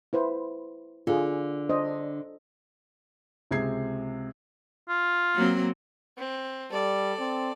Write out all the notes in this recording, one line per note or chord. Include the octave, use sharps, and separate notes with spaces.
E4 B4 C5
D3 F4 G#4
D4 C5 D#5
C#2 C3 G#3 G#4 G#6 C7
F4
F#3 A#3 C4
C4
G3 A4 D5
C4